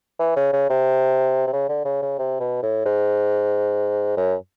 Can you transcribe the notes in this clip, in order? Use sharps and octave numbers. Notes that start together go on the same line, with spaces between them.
E3
C#3
C#3
C3
C3
C#3
D3
C#3
C#3
C3
B2
A2
G#2
F#2